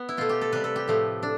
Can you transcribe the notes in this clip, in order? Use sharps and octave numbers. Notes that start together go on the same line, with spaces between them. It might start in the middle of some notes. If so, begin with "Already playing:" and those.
Already playing: B3
E4
B2 A3 F4
G4
A4
C3 G3 B4
A4
G4
A2 F3 A3
D4